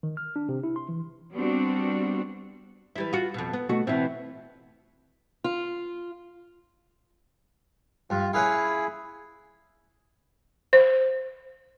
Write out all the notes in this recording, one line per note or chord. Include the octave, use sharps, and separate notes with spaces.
D#3
F6
D4
C3
E4
C6
E3
G3 B3 C4 D4 F#4
E3 G3 E4
F4 F#4
F2 B2
B3
B2 A3 F#4
B2 E3 C4 E4
F4
G2 F4
C#4 E4 G#4 B4 F5
C5